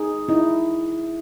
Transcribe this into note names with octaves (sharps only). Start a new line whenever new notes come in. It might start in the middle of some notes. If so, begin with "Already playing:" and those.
Already playing: D#4 G#4
D#4 E4